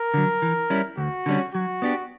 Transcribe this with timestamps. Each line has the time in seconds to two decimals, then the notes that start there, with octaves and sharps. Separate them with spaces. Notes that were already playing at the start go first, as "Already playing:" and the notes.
Already playing: A#4
0.14 D3 F#3
0.42 E3
0.70 G3 C#4 E4
0.97 D2 F#4
1.26 D3 G3 C#4
1.54 F#3 F#4
1.82 B3 D4 G4